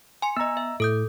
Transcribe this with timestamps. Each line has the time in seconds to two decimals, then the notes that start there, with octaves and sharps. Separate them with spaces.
0.22 G#5 C6 C#7
0.37 B3 D#5 A#5 E6
0.57 E5
0.80 A2 A4 D#6 G6